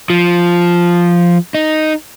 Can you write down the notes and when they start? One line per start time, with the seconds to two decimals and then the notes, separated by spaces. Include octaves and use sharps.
0.10 F3
1.55 D#4